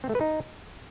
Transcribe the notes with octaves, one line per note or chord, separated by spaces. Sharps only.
C4
A3
B4
D#4